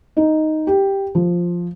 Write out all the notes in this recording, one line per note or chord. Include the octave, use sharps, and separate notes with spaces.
D#4
G4
F3